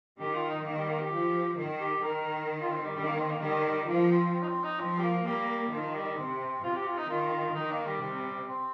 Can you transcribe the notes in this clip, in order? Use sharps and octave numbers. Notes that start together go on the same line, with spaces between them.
D#3 G4
F4
D#4
D#3 A#3
G3
A#3
G4
F3
D#3
G4
D#3 A#4
F4
C4
G3
D#3 G3
A#3
C4
A#3
D#3 G3
G3
F3 A#3
C4
C4
D#4
C4
D#4
F3 C4
G3
A#3
G3 A#3
D#3 F3
G3
C3 C4
C3 F4
G4
F4
D#4
D#3 F4
D#3 D#4
A#3
G3
C3 G3
C4